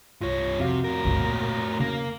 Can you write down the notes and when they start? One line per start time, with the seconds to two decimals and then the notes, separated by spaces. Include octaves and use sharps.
0.21 C2 G2 F4 C#5
0.60 F2 C3 F#4 F5
0.84 A2 A#4
1.05 G1 C#2
1.19 A#2
1.80 C#3 A#3